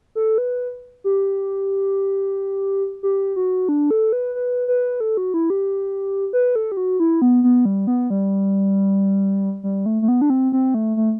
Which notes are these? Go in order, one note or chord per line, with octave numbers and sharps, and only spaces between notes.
A4
B4
G4
G4
F#4
D4
A4
B4
B4
B4
A4
F#4
E4
G4
B4
A4
G4
F#4
E4
B3
B3
G3
B3
G3
G3
A3
A3
B3
D4
C4
C4
A3
A3